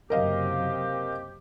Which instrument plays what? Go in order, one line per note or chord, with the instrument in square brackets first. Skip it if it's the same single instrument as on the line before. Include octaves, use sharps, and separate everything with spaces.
[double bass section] F#1 C3 F#3 [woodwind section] C4 G4 [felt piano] A#4 D#5 F5